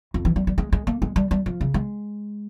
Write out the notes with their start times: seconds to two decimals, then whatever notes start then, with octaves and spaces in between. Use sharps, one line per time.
0.14 F2
0.25 E3
0.36 G3
0.47 G3
0.58 G#3
0.72 G#3
0.87 A#3
1.02 G#3
1.16 G3
1.31 G3
1.46 F3
1.61 C#3
1.74 G#3